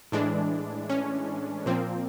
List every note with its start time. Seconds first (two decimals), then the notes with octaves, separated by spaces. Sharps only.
0.12 A2 E3 G#3 D4
0.90 C#4
1.66 A#2 F3 A#3 C4